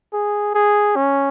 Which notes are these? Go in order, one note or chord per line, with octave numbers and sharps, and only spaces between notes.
G#4
G#4
C#4